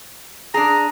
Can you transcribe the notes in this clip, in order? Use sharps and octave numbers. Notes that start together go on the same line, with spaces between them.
D4 G#4 A#5